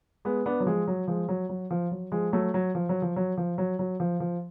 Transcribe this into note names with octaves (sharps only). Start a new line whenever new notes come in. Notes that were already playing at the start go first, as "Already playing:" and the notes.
G#3 B3
B3 D4
F#3
F3 G#3
F#3
F3 G#3
F#3
F#3
F3
F#3
F3 G#3
F#3 A3
F#3
F3
F#3
F3
F#3
F3
F#3
F#3
F3
F3